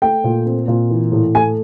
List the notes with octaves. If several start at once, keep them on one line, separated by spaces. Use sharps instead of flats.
A3 G5
A#2
C4
A#2
E3
A2
A3 G#5